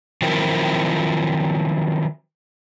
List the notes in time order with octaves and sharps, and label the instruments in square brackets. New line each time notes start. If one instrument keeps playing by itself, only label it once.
[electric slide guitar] D#3 F3 F#3 C4 E4 A#4